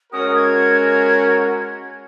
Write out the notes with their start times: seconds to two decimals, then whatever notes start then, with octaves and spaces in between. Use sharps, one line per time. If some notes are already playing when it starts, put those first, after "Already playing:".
0.13 G#3 C#4 F#4 A#4 D#6
0.35 G#6